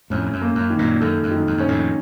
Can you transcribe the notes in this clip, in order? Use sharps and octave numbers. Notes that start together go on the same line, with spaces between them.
F2 A2 C#4
F#2
A#3
F#2
D#3
F#2 A#2
F#2 A4
F#2
D#3
F2
F#2 C#4
F2 A2